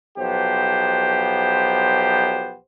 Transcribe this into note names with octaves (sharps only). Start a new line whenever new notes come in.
B1 F3 B3 G4 C5